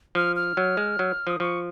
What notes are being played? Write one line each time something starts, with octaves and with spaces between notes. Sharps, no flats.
F3 F6
F6
F#3
G#3
F#3
F3 D#6
F3 C#6